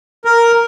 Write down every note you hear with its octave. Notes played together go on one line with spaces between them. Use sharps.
A#4